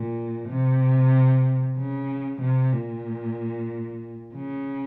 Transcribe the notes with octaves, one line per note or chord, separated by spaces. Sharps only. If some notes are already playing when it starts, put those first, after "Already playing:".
Already playing: A#2
C3
C#3
C3
A#2
C#3